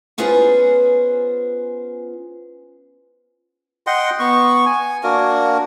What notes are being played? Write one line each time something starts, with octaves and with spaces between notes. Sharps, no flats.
B3 C#4 F4 G#4 B4 C5
D#5 F#5 G5 C6
B3 C#6
G#5
A#3 D4 F#4 A#4